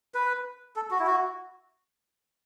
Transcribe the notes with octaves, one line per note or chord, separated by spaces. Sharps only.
B4
A4
F#4
E4
F#4